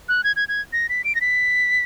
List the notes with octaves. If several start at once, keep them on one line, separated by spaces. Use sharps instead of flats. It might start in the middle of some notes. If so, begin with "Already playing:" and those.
F#6
G#6
G#6
G#6
A#6
B6
D7
A#6
B6